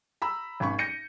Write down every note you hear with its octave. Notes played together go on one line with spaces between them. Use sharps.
A#5 B5 E6
G#1 C#4 B5 C#6
G6 A#6 C#7 D#7